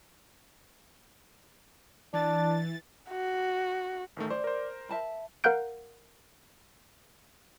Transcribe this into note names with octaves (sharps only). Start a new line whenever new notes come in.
E3 D4 A6
F#4
A1 D#3 A3
C5 D5
A#4 C5
E5 A5 B5
A#4 F5 F#5 F#6 G6 D7